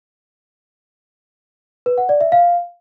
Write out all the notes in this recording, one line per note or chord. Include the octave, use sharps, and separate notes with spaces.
B4
F#5
D5
E5
F5